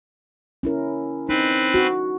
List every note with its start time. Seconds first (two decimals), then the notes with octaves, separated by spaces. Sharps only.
0.63 C#4 E4 A#4
1.29 C4 D#4 B4
1.74 F#4